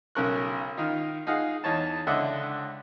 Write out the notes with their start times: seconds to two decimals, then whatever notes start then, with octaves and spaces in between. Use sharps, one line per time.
0.15 B1 C#3 C#4 A#4 C#6 F#6
0.78 D#3 D#4 F4
1.27 D#4 F4 G#4 F5 F#5
1.64 E2 D#4 C#5 A5
2.07 C#2 D3 D4 D#5 E5 F#5